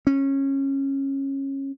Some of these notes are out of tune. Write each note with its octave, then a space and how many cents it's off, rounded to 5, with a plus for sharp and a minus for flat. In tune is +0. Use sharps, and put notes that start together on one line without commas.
C#4 -20